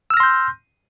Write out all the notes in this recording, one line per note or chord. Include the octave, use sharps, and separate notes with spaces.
C6 E6 F6 G6 A#6